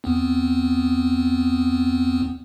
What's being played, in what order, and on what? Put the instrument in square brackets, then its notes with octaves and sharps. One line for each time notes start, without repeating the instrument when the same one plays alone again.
[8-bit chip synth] E2 B3 C4